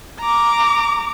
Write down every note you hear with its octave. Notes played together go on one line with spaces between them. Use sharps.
A#5 D6